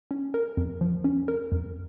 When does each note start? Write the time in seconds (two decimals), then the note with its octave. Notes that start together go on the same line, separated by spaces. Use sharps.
0.11 C#4
0.34 A#4
0.57 F2
0.81 F3
1.04 C#4
1.28 A#4
1.52 F2